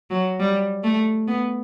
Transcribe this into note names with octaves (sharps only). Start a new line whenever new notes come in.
F#3
G3
A3
B3